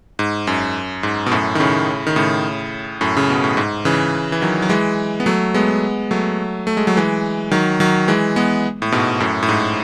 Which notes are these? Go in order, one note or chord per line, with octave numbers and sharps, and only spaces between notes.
G#2
F#2
G#2
B2
F#2 A2
D#3
A2 C#3
D#3
A2 C#3
F#2 A2
C#3
B2
A2
G#2
C#3 E3
E3
D#3 F#3
F#3
E3 G#3
B3
F#3 A3
G#3 B3
F#3 A3
A3
G#3
F#3
E3 G#3
D#3 F#3
D#3 F#3
E3 G#3
G#3 B3
A2
G#2 B2
F#2 A2
A2
G#2